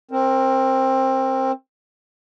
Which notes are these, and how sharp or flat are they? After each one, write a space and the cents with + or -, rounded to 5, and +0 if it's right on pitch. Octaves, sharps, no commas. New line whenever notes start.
C4 +20 A#4 -5